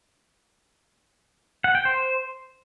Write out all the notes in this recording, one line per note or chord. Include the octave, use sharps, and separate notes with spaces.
F#5
G5
C5